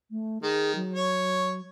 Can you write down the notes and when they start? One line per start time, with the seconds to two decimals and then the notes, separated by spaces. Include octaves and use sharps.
0.11 A3
0.43 D#3 G#4
0.76 F#3
0.94 C#5